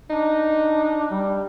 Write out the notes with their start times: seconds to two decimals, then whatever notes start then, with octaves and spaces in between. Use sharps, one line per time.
0.10 D4 D#4
1.11 G3